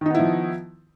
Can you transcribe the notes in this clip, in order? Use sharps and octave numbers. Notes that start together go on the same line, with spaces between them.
D#3 F3 B3 D#4 E4